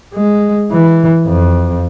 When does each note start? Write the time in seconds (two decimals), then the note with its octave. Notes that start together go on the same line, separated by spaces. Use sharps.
0.14 G#3
0.72 E3
1.27 F2